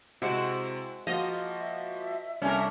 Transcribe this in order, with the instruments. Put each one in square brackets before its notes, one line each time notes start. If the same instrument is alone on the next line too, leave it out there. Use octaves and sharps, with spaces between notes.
[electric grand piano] C3 C4 C#7 [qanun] G#3 F#4 C5 [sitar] E4
[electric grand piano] F3 A#3 F#4 [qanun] F4 A#5 [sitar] D#5
[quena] E5
[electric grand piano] C2 G#5 [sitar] C#4 A#4 [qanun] D4 A4 F5 [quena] E5